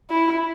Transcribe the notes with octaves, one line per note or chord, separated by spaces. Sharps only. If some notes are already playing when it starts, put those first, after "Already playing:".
E4